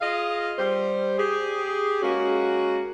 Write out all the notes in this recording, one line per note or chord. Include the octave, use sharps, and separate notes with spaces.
F4 G#4 D#5 F5
G3 C5
G4 G#4
G#3 A#3 C#4 F#4